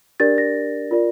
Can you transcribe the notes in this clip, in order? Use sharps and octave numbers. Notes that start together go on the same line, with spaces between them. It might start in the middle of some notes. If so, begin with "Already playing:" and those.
D4 G4 A#4 D5 A6
A#6
F4 A#4 D5